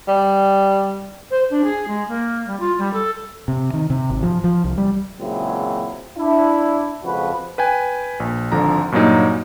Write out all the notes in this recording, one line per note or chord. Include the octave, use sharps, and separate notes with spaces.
G3
C5
D4
G#4
G#3
A#3
G3
F4
G3
A4
C3
D#3
C3
G#1
F3
F3
C2
G3
A#2 C#3 F#3 G#3 C4 E4
D4 E4
F2 C#3 F3 G#3 F#4 B4
B4 G5 G#5
A#1
G#1 D3 F3 A#5
G2 A#2 F#3 A#3 D#4